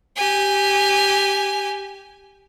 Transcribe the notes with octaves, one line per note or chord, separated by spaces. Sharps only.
G4 G#5